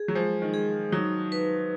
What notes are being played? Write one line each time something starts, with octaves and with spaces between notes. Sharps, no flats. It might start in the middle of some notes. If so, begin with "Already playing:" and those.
Already playing: G#4
F#3
F3 G#3
D#3
G#4
F#3 D#4
B4